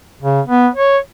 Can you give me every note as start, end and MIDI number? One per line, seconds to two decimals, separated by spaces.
0.22 0.41 49
0.46 0.68 59
0.75 0.98 73